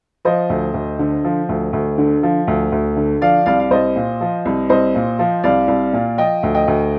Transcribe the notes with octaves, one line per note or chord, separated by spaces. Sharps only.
F3 C5 D#5
D2
D2
D3
F3
D2
D2
D3
F3
D2
D2
D3
F3 D5 F5
C2 D5 F5
F5
C2 C5 D#5
A#2
F3
C2
C2 C5 D#5
A#2
F3
C2 D5 F5
C2
A#2
F3 D#5 G5
D2
D#5 G5
D2